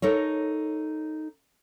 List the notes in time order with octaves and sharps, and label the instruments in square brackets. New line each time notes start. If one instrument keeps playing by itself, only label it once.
[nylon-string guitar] D#4 A4 A#4 C#5